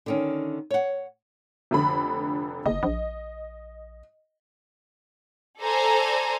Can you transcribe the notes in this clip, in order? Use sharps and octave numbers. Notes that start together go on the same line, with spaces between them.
D3 D#3 C#4
C#5 F#5
F1 D3 B5
F#1 D#5
A#1
A4 C5 D5 G#5 A#5